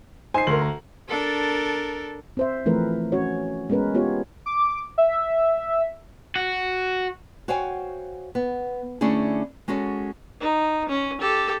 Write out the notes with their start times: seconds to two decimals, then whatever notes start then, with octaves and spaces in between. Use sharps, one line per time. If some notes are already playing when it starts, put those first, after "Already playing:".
0.34 D#4 C5 G#5 C7
0.47 D2 A#4 C6 F#7
0.61 A#5
1.08 D4 A4 A#4
2.37 C4 C5 E5
2.66 E3 F3 A3 C4 A#4 B4
3.12 C#4 F#4 C#5
3.70 G#3 B3 C#4 A#4 B4
3.94 B3 F4 G4 C#5
4.46 D6
4.98 E5
6.36 F#4
7.48 F#4 C5 C#5 F5 G5 G#5
8.35 B3
9.01 D3 A3 C#4 D4 E4 G#4
9.68 G#3 C#4 F#4 A4 C#5
10.40 D#4
10.89 C#4
11.21 G4 A4